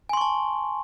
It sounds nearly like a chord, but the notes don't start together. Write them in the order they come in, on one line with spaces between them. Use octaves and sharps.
G#5 C6 C#6 A5